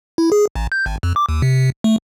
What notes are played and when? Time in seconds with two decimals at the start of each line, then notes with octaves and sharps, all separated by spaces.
0.18 E4
0.32 G#4
0.55 A1
0.72 G6
0.86 G#1
1.03 F2
1.16 D6
1.29 D#2
1.42 C3
1.84 A3